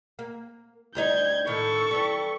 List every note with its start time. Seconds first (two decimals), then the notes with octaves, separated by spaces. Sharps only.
0.19 A#3
0.95 D2 G3 D#4 G6 G#6
1.47 A2 D#3 A4 C#6
1.91 E3 G3